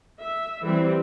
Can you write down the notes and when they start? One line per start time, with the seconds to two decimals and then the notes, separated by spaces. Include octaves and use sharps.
0.19 E5
0.64 E3 G3 C4